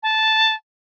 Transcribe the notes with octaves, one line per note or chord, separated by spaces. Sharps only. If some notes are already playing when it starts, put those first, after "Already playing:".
A5